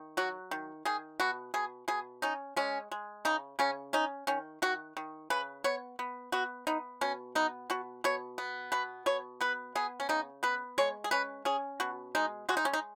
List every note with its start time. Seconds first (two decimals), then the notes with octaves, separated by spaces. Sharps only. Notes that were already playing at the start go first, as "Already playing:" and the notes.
Already playing: D#3
0.17 F#3 F#4
0.51 D#3
0.85 D#3 G#4
1.20 B2 F#4
1.54 B2 G#4
1.88 B2 G#4
2.22 C#4 D#4
2.56 G#3 C#4
2.91 G#3
3.25 C#3 D#4
3.59 C#3 C#4
3.93 C#4 D#4
4.27 D#3 C#4
4.62 D#3 F#4
4.97 D#3
5.30 C#3 B4
5.64 B3 C#5
5.99 B3
6.32 B3 F#4
6.67 B3 D#4
7.01 B2 C#4
7.35 B3 D#4
7.70 B2 F#4
8.04 B2 C#5
8.38 B3
8.72 B2 B4
9.06 B2 C#5
9.41 B3 B4
9.75 B3 G#4
10.00 C#4
10.09 C#3 D#4
10.43 B3 B4
10.78 G#3 C#5
11.04 G#4
11.11 C#4 B4
11.45 C#4 G#4
11.80 B2 F#4
12.15 G#3 D#4
12.49 G#3 F#4
12.57 D#4
12.65 C#4
12.73 D#4